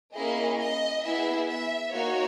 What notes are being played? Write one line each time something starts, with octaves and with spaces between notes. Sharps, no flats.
A#3 C#4 E4 G#4 D#5
D#5
B3 E4 G#4 E5
E5
A#3 D#4 F#4 C#5